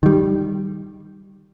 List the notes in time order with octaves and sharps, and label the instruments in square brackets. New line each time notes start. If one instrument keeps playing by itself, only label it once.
[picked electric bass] D#3 G3